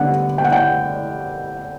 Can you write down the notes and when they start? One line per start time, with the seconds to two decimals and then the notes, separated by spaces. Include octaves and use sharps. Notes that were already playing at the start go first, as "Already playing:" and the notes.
Already playing: D3 G3 B3 F#5
0.38 G5
0.44 F#5
0.52 G5